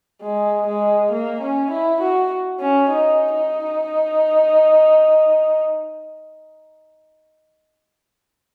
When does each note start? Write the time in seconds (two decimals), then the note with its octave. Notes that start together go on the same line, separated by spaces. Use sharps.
0.22 G#3
0.67 G#3
1.11 A#3
1.42 C#4
1.71 E4
2.01 F#4
2.60 C#4
2.90 D#4
3.35 D#4